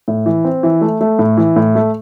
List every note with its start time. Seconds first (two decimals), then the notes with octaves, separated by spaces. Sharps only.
0.08 A2
0.26 E3
0.45 C4
0.63 E3
0.81 A3
1.01 A3
1.19 A2
1.37 E3
1.56 A2
1.75 A3